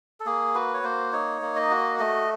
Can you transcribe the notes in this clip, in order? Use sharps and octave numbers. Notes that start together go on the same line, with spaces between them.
A4
A#3 G#4
F#4 B4
C#5
A#3 C5
D#4 C#5
A#3
D#5
F#4
A3 D#5